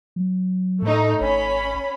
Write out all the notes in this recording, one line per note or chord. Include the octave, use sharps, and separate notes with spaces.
F#3
A2 A3 D#4
G#1 C#4 B5